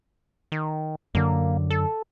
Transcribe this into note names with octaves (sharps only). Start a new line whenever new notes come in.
D#3
F#2 D3 A#3
A4